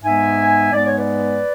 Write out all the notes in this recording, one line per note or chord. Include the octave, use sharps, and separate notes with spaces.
G#2 G#3 B3 E5 G#5
G#2 G#3 B3 D5
C#5
B4 D5